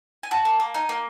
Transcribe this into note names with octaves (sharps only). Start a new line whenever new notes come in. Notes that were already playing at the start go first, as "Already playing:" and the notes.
G#5
F#4 A5
A#3
A#3
D#4 G#5
A#3